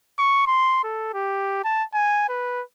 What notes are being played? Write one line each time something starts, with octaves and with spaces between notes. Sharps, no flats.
C#6
C6
A4
G4
A5
G#5
B4